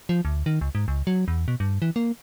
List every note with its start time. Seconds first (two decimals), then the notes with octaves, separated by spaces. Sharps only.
0.09 F3
0.25 D2
0.46 D#3
0.61 C#2
0.75 G#2
0.88 C#2
1.07 F#3
1.28 E2
1.48 B2
1.60 G2
1.82 E3
1.96 A#3